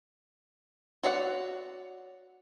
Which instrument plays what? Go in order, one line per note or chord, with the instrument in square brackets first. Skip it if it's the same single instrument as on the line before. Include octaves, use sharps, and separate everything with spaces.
[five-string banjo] F#4 C#5 D5 E5 F#5